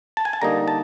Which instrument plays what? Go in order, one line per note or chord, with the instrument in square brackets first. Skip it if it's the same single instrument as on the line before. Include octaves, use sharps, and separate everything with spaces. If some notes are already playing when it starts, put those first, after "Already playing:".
[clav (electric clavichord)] A5
G#5
A5
D3 G3 A#3 D#4 A#5
A5